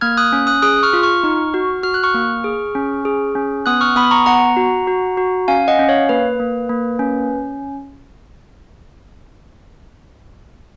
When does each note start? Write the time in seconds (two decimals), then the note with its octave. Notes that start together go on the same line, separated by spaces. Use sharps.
0.01 A#3 F6 G#6
0.18 D#6 F#6
0.33 C#4
0.47 D#6 F#6
0.62 G#4 D#6 F#6
0.83 C#6 F6
0.93 F4
1.03 C#6 F6
1.24 D#4
1.54 F#4
1.83 F#4 F6
1.94 F#6
2.03 C#6 F6
2.15 A#3
2.44 G#4
2.75 C#4
3.05 G#4
3.35 C#4
3.66 B3 D#6 F#6
3.81 C#6 F6
3.96 B3 B5 D#6
4.11 A#5 C#6
4.26 B3 F#5 A#5
4.57 F#4
4.87 F#4
5.17 F#4
5.48 C#4 F5 G#5
5.68 D#5 F#5
5.79 C#4
5.89 C#5 F5
6.09 A#3 B4
6.40 A#3
6.70 A#3
6.99 C#4